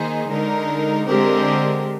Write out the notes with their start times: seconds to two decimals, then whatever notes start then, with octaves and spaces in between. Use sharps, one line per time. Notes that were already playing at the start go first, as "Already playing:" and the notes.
Already playing: D#3 A#3 D#4 G#4 C5
0.28 D3 G#3 D#4 A#4
1.06 D3 G#3 C4 G4 A#4